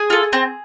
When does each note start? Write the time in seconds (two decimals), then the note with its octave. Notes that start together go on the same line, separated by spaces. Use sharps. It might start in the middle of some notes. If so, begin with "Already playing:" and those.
Already playing: G#4 G#5
0.10 F4 A4
0.33 C4